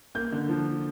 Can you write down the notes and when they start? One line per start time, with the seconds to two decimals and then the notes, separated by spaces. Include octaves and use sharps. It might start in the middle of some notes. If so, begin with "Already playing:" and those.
0.15 A#3 G6
0.32 D3
0.49 F3